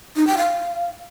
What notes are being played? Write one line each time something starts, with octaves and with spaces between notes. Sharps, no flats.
D#4
G5
F5